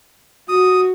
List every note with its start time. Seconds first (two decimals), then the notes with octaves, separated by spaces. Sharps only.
0.49 F#4 D#6